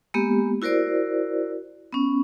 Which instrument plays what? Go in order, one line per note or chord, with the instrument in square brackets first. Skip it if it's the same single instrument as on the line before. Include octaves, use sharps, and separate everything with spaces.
[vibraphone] G#3 A#3 B3 G4
E4 F#4 A#4 C5 D5
B3 C#4